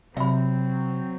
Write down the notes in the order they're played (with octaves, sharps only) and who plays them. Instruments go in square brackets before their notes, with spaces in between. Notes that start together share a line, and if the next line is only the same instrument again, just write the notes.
[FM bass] C3 [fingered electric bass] F#3 [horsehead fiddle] C4 [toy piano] E5 B5